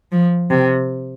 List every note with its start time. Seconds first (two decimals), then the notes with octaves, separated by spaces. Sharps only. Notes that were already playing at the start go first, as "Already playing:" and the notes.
0.12 F3
0.50 C3